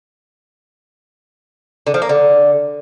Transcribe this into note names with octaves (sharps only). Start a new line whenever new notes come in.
D3
F3
A#3
D3